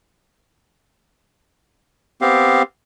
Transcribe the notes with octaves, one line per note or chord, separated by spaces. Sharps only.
B3 C4 G4 F5